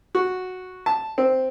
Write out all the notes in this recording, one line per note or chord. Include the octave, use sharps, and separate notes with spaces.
F#4
A5
C4